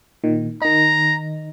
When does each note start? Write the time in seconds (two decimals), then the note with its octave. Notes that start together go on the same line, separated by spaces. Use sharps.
0.24 A#2 D#3
0.62 D#3 D#4 A#5